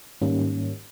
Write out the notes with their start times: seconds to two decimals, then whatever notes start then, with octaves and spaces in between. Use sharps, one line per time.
0.21 G#2 D#3 G3 A#3 C#4